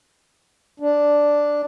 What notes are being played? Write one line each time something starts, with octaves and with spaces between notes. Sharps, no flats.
D4